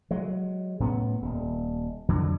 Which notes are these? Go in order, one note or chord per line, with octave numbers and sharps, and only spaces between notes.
F#3 G#3
A2 B3 C#4
D#1
F2 D3 F#3